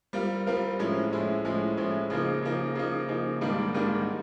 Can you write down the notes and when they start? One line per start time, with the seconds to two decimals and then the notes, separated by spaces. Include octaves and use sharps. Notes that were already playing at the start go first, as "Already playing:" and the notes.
0.13 G3 C4 F4 A#4
0.47 G3 C4 F4 A#4
0.79 A2 F3 G#3 C#4 E4
1.11 A2 F3 G#3 C#4 E4
1.45 A2 F3 G#3 C#4 E4
1.77 A2 F3 G#3 C#4 E4
2.10 C#3 F3 A#3 D#4
2.42 C#3 F3 A#3 D#4
2.75 C#3 F3 A#3 D#4
3.08 C#3 F3 A#3 D#4
3.41 G#2 D#3 G3 A#3 D4
3.74 G#2 D#3 G3 A#3 D4